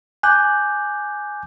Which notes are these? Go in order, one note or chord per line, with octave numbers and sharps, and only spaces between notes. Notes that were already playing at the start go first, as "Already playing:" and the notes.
G#5 D6 F#6 G6